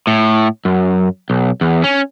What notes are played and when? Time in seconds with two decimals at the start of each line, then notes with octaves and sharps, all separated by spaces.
0.07 A2
0.65 F#2
1.30 B1
1.61 E2
1.84 C#4